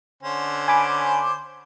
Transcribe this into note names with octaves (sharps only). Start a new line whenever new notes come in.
D3 C#4 C5
G#5 B5 D6